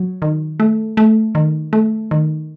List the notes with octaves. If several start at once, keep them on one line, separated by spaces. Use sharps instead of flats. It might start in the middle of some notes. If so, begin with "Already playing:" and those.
Already playing: F#3
D#3
A3
A3
D#3
A3
D#3